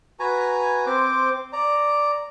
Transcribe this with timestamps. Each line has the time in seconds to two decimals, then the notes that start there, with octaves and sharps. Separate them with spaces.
0.20 F#4 B4 G#5 A#5
0.86 C4 C5 D6
1.53 D5 A#5